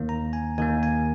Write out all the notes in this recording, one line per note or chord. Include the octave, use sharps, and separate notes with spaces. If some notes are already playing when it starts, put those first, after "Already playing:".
Already playing: D#2 D#3 A#3
A#5
G#5
D#2 D#3 A#3 G#5
G#5